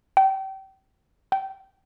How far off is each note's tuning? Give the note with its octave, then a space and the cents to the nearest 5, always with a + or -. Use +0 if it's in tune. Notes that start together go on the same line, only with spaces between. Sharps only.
G5 -30
G5 -20